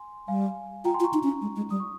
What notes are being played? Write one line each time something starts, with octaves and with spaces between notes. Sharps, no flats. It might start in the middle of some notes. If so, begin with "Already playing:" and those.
Already playing: G#5 C6
G3 F5 G#5
F4 G5 A#5
G#5 C6
F4
A#5 C#6
D#4
C#4
G#3
G#3
G3 D#6
C#6